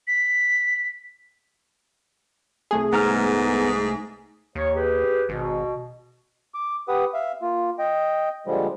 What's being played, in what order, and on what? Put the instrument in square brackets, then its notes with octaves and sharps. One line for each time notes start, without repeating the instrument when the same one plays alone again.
[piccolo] B6
[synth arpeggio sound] C2 A3 G#4
[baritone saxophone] G#2 [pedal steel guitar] B3 A#5 F6
[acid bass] D#2 [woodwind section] C#5
[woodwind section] G4 G#4 B4
[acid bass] G#1 [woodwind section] B2
[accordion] D6
G4 B4 F#5 D#6
E5 F5
A#3 F4
D#5 G5
A#2 D3 F3 G3 G#3